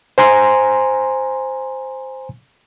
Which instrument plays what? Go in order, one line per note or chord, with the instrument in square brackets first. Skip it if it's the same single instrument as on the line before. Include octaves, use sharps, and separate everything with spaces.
[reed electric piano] C5 G#5 A#5 C6